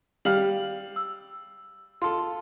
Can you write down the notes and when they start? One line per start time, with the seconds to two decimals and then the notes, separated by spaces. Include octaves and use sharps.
0.25 G3 F5 F6 F#7
0.96 E6
2.02 F4 A4 C6